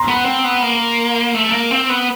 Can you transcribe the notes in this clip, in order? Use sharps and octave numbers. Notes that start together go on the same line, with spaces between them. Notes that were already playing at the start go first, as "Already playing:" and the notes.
Already playing: A#5 C6
B3
C4
B3
A#3
A3
A#3
C4
B3